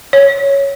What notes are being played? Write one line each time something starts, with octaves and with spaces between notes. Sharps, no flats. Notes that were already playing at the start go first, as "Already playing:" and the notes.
C#5